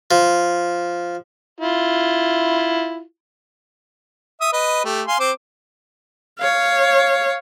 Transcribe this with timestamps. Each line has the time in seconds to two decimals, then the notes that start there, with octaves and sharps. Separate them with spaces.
0.11 F3
1.61 E4 F4
4.41 E5 D#6
4.53 B4 D#5
4.85 A3 G4
5.08 F5 G#5 C6
5.20 C4 C5 D6
6.39 C#5 F5